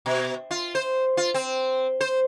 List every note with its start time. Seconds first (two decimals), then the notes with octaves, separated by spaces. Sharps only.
0.06 B2
0.51 F4
0.75 C5
1.17 F4
1.34 C4
2.01 C5